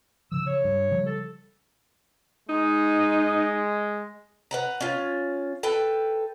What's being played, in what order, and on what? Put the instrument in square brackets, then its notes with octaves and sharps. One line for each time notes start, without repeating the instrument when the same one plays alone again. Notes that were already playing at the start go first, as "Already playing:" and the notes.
[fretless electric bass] C#3 F3 [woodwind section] E6
[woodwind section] C#5
[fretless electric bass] G2
C#3 F3 G3
[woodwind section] A4
[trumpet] G#3 [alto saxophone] D#4
[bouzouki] B4 F#5 A#5
C#4 F4
A4 B4 G5